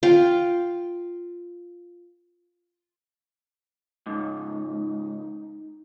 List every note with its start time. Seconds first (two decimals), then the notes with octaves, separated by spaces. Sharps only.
0.03 F4 F5 G5
4.06 C#2 G#2 D#4